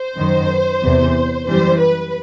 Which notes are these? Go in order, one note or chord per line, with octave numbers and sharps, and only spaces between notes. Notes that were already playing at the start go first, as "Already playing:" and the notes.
Already playing: C5
F#2 D#3 F#3
E2 C3 E3
F#2 E3 G3 C5
B4